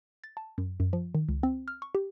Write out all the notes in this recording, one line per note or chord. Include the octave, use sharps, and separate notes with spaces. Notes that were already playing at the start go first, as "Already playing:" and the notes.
A6
A5
F#2
F#2
F3
D#3
C#2
C4
F6
C#6
G4